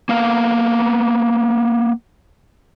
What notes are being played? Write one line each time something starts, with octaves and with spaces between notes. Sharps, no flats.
A#3 B3 F5